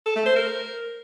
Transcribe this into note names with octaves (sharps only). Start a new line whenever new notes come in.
A4
A3
C5
A#4